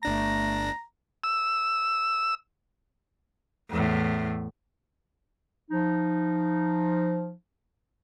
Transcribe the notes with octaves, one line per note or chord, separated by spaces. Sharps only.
G1 A3 D4 A#5 A#6
E6
E2 A2
F3 D#4